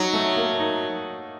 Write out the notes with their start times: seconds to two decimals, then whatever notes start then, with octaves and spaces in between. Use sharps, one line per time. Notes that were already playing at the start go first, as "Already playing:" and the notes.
Already playing: F#3 D#4
0.13 A3
0.37 A#3
0.59 D#4